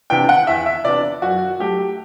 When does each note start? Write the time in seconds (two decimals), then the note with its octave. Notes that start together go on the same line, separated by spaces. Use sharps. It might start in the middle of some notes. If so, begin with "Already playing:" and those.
0.10 C3 E3 B3 D4 G5
0.29 F#5
0.47 E2 E5
0.66 E5
0.85 C3 E3 B3 D4 D5
1.22 F#2 F#4
1.59 F#3 A3 G4